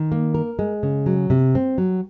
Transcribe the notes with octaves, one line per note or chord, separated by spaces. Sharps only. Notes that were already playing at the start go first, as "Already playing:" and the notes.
Already playing: D#3
A#3
A#4
G#3
C#3
F#3
C3
C4
F#3